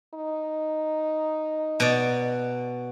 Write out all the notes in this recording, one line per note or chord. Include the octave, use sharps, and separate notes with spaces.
D#4
B2 D5